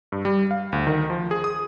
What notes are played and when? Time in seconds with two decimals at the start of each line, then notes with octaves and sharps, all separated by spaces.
0.12 G2
0.25 G3
0.51 F5
0.73 D2
0.87 D#3
1.10 F3
1.31 G#4
1.44 D#6